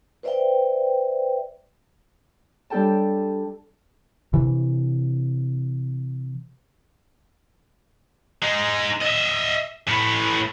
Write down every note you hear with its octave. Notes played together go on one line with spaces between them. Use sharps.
B4 C5 D5 E5 F5 G5
G3 D4 A4 G5 A5
C3 E3
G#3 D#4
D#5 E5
A2 B4